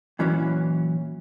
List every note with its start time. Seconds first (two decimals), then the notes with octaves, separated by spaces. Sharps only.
0.19 A#2 E3 F#3 C#4